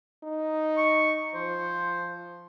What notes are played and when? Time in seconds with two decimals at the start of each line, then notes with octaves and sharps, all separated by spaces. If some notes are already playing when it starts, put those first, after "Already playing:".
0.23 D#4
0.77 C#6
1.34 F3 C5